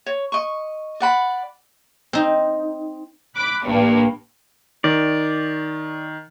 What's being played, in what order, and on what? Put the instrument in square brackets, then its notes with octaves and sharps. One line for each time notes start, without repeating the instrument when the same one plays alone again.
[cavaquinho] C#5
D#5 C#6
D5 F#5 B5
[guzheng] C4 D#4
[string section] B5 D6 F#6
A1 G2 A#3
[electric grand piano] D#3 [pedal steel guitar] D5